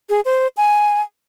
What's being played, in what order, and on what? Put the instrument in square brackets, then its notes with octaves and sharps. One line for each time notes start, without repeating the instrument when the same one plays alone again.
[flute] G#4
C5
G#5